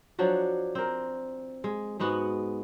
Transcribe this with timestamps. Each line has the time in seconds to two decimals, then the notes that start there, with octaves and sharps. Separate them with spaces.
0.19 F3 F#3 D4 F#4
0.75 C4 A#4
1.64 G#3
2.00 G#2 G#3 B3 F#4